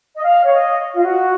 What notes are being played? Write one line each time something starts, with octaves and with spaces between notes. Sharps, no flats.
D#5
F5
C#5
D#5
F4
F#4